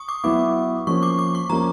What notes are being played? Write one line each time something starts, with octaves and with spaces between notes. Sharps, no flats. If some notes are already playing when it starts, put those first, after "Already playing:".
Already playing: C#6 D#6
D6
F#3 B3 E4 D6
F3 A#3 C#4 C#6
D6
D6
C#6
F3 A#3 C#4 A#5